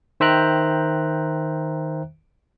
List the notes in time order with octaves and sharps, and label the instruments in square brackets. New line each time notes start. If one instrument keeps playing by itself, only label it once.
[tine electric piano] D#3 C5 E5 G5 A#5 F#6